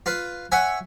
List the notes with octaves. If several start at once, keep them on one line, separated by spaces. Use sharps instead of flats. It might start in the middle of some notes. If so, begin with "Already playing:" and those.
F4 B4
C#5 E5 F#5 G#5